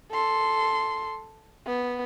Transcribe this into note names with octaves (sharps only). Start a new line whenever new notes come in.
A4 C6
B3